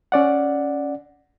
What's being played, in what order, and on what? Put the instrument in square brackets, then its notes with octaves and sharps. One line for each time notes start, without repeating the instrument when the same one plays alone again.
[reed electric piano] C#4 D5 F#5